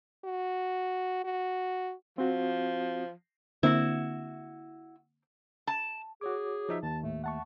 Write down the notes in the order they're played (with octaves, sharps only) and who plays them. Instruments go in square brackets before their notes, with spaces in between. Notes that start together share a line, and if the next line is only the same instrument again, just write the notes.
[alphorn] F#4
F#4
[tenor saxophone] F3 [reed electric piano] C4 F#4
[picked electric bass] D3 A#3 C4 [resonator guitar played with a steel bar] E4 F#4
[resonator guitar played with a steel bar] A5
[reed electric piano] F#4 C#5 D6 [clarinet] G#4
[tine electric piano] F3 D#4 E5
[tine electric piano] D#2 [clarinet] A5
[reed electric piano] A2 [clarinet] A3
[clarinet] A3 [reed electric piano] F#5 A5 C#6